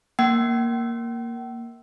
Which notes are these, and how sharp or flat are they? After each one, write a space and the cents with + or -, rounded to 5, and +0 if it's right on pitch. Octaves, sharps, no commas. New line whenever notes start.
A#3 +0 G5 -45